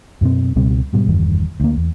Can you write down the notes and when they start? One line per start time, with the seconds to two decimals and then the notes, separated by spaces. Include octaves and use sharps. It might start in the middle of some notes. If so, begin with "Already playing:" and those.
0.21 F#2 B2 B3 C4
0.56 C#2 B2 G3 C4
0.93 G#2 B2 G3
1.08 F#1 E2 G2 D#3
1.60 D2 A#3
1.77 E2